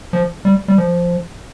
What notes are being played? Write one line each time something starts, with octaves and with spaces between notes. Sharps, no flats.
F3
G3
G3
F3